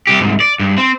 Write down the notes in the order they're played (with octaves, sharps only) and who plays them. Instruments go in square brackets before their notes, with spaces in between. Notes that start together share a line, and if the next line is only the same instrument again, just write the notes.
[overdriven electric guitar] C2 G4
C2 G#2
D5
G2
C4